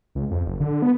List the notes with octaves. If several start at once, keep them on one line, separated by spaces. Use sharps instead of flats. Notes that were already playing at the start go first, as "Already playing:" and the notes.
C#2
F2
F#1
D3
B3